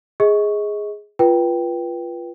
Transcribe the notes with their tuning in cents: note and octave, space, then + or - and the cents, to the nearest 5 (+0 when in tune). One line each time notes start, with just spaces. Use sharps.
G#4 +0 D#5 +30 C#6 +0
F4 -15 B4 -20 G5 +0